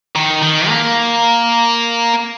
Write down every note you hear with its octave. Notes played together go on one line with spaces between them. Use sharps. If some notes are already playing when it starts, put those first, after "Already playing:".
D#3
D#3
A#3